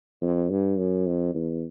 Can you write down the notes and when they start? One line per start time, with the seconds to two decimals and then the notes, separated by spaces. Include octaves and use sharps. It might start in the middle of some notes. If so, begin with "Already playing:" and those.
0.21 F2
0.50 G2
0.78 F#2
1.07 F2
1.35 E2